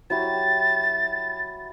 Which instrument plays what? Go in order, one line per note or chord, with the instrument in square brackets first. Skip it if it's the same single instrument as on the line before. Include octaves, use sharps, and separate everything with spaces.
[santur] F#3 E4 G4 [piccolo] A6